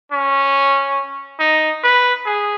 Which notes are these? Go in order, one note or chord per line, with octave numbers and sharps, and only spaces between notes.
C#4
D#4
B4
G#4